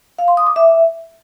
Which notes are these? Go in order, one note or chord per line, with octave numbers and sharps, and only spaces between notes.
F5
C6
D#6
D6
E5